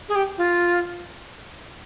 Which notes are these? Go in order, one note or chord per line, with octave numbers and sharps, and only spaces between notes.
G#4
G4
F4